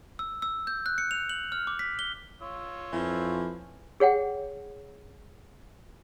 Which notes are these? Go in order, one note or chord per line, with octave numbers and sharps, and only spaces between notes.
E6
E6
G6
F#6
C#7
F7
F#7
F6
D6
B6
G7
F4 C#5 E6
F2 E3 F3
G#4 C#5 F#5 G5